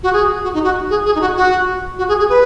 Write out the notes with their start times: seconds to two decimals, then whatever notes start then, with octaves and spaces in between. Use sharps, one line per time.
0.03 F#4
0.13 G#4
0.44 F#4
0.54 D#4
0.64 F#4
0.90 G#4
1.06 G#4
1.15 D#4
1.21 F#4
1.37 F#4
1.98 F#4
2.08 G#4
2.19 G#4
2.30 B4